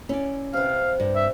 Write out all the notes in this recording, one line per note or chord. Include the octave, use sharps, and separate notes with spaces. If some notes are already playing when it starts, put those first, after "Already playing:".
C#4 E4 D5
C3 B4 F5
G2
E5